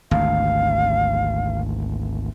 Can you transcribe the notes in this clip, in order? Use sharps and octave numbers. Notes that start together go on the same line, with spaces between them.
G#1 D2 F5